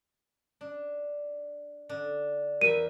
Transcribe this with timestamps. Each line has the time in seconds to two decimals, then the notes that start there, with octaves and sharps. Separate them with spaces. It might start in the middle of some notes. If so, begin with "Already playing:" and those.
0.61 D4
1.89 D3 D4
2.61 E2 E4 A#4 E5 D#7